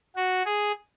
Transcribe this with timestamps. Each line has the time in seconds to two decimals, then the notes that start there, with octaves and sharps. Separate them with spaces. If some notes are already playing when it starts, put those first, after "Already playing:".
0.16 F#4
0.46 G#4